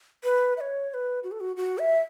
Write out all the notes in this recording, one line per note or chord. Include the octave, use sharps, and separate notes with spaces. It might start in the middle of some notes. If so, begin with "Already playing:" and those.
B4
E5
C#5
C#5
B4
F#4
A4
F#4
F#4
E5